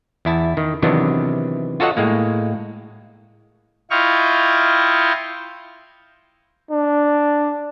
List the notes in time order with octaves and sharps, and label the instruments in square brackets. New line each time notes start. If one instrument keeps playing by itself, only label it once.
[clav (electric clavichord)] E2 E4 A5
D#3
C3 D#3 E3 F#3 B3 D4
F4 F#4 A4 C#5 D#5 F#5
A2 G#3 A#3
[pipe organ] E4 F4 D#5 G5 C#6 F6
[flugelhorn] D4